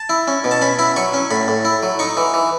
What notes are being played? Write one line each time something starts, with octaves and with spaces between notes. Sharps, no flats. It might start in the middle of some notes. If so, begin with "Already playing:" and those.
Already playing: A5
E4
C#4
B2
A5
C#4 B5
E4 B5
F#3 C#6
C#4
A2 B5
A2
E4
F#3
D#4 C#6
E3
E3